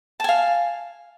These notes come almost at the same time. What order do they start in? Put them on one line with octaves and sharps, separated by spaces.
A5 G#5 F5